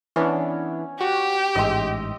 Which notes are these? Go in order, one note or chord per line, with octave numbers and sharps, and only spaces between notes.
E3 B3 C#4 D4
F#4 G4
A1 G#2 D#5 E5 C6